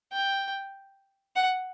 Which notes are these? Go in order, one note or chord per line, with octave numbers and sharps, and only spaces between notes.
G5
F#5